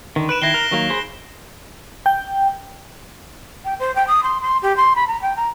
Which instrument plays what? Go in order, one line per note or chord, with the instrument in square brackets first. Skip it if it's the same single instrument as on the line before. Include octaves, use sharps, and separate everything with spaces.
[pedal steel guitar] D3 D#3
[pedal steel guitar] B4 [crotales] F#6 D7 E7
[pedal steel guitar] D#3 E4 [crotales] A#6 C7 G7
[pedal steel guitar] A#4
D#3 F#3 A#3
G#4 C5 B5
[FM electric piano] G5
[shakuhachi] G5
C5
G5
D#6
C6
C6
G4
C6
B5
A#5
G5
A#5